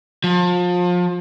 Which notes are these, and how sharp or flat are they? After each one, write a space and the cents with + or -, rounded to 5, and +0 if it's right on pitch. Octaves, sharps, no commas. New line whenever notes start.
F3 +30